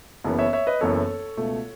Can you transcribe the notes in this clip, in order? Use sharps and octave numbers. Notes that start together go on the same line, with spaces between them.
F#1 F#2 E3 B3
C#5 E5
C#5 E5
B4 D#5
F#1 F#2 E3 B3 A4 C#5
C#2 B2 A3